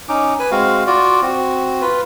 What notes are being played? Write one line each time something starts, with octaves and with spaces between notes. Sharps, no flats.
C#4 D#4 D6
B4 G#5
G#3 C4 F#4 F5
F4 F#4 D5
C4 F#4
F4 B4